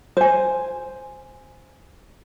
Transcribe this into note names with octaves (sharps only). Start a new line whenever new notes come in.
C5 G#5